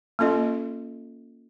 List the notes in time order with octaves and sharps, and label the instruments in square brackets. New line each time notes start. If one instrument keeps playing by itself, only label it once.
[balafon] A#3 C#4 F4 A4 D#5